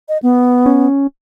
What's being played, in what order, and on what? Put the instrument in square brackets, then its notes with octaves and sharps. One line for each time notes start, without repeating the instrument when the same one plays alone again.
[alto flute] D#5
B3
[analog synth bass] C#4